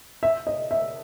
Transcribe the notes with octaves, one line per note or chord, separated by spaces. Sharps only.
E5
D#5
E5